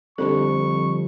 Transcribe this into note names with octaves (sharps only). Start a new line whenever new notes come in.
F2 D3 F3 G3 D4 A4 C#6